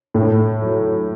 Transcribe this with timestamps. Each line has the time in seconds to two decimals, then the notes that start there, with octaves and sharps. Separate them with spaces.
0.14 A2
0.62 F#3